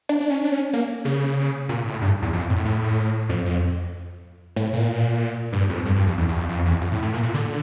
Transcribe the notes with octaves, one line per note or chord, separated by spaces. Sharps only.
D4
D4
C#4
D4
C#4
A#3
C#3
A#2
A2
G2
E2
F2
A2
A2
F2
F2
A2
A#2
G2
F2
G2
G2
F2
E2
E2
F2
F2
E2
F2
A2
A2
A#2
A#2
D3